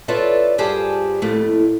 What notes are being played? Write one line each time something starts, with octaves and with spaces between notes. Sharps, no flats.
F4 A4 B4 C#5 D5 E5
G2 F4 G4 G#4 C5 A5
F2 A2 A3 A#3